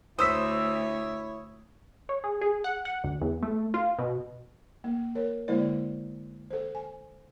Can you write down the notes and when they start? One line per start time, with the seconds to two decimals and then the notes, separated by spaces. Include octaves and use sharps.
0.19 D2 E4 C5 C#5 D#6 E6 B6
2.09 C#5
2.24 G#4
2.41 G#4
2.64 F#5
2.85 F#5
3.04 D2
3.21 E2
3.43 A3
3.74 F4
3.98 B2
4.84 A#3
5.15 A#4 C#5
5.48 D3 G#3 A#3 E4 C5 D5
6.51 A4 C5
6.75 G#5